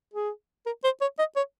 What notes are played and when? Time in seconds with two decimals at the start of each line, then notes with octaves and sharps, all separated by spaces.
0.14 G#4
0.66 A#4
0.84 C5
1.01 C#5
1.19 D#5
1.36 C#5